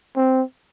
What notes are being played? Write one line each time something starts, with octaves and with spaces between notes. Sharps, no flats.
C4